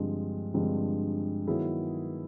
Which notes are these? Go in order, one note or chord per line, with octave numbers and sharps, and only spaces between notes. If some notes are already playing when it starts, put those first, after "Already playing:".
Already playing: G2 D3 F3 G#3 C4
G2 D3 F3 G#3 C4
D#3 F#3 B3 E4 G#4